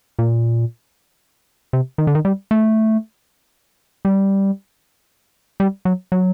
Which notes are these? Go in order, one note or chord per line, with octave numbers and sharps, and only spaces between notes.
A#2
C3
D#3
D3
D#3
G3
A3
G3
G3
F#3
F#3